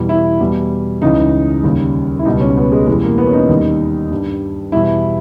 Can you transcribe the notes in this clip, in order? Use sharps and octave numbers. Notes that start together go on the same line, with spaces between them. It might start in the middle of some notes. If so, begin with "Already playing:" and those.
Already playing: E2 B2 G3
E4
E2 B2 G3
C#2 C#3 E3 D#4
D#2 C#3 G3
E4
C#2 B2 G3 D#4
C#4
B3
G#3
E2 B2 G3 G#3
A#3
B3
C#4
D#4
D#2 D#3 G3
G2 G3
E2 B2 G3 E4